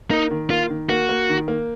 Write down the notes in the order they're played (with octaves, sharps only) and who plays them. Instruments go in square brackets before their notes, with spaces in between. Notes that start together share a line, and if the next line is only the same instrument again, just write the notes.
[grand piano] A#3 [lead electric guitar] D#4
[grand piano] D#3
[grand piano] A#3 [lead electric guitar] F4
[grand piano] D#3
[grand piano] A#3 [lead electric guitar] F#4
[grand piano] A#3
D#3
A#3